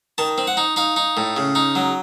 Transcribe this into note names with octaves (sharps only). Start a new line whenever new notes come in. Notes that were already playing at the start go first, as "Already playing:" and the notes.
D#3 A5
C4
F#5
D#4
D#4 F5
D#4
A2
C#3
D#4
F#3